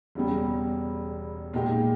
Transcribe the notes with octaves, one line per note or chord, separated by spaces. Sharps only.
E1 E2 C#3 G3
A#2 G#3 D#4 G4